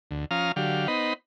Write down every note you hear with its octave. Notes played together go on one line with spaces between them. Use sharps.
D2
F3 C#4 F5 A#5 D#6 F6
D3 F#3 G4 F5
B3 D#4 C5 D#5 B5